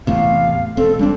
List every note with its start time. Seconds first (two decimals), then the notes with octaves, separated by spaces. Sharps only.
0.07 E2 A2 C3 F5
0.77 E1 C4 A4
0.99 G3 C4 D4